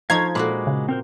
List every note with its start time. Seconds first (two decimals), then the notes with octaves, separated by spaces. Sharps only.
0.10 F3 D#4 F5 A#5 C#6 G#6
0.35 A#2 G#3 A#3 F#4 B5 D6
0.67 C#3
0.89 C4 A#4 C5